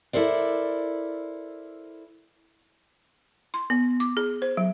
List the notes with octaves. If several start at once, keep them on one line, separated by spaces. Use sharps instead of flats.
E4 A4 A#4 C5 D5
C6
B3
D6
G#4
C5
F#3